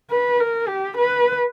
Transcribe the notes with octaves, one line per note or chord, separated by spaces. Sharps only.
B4
A#4
G4
B4